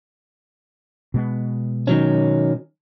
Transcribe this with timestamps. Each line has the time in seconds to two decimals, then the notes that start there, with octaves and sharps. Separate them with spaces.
1.14 B2 G#3 B3
1.87 D#3 F#3 C#4